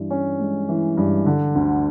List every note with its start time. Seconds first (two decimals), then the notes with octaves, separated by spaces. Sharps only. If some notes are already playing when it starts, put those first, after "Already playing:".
Already playing: G2 E3
0.11 C#4
0.40 G#3
0.69 E3
0.97 G2
1.26 D3
1.55 D2